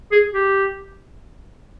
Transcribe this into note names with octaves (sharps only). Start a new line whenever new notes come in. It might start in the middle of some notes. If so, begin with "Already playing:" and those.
G#4
G4